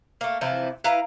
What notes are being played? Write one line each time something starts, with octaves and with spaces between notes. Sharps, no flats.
A3 A#3
C3 E3 F3 E4
E4 B4 F5 A#5